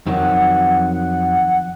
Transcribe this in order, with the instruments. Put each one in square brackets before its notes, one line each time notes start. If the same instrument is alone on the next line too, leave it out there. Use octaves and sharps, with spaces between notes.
[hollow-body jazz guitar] F2 D#3 F#3 [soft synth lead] F#5